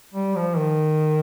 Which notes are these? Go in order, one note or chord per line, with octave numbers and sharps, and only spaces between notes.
G3
F3
D#3